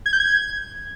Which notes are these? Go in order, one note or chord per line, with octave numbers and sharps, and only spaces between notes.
G#6
G6
G#6